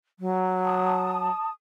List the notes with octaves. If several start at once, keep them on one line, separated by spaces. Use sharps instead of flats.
F#3
A5 D#6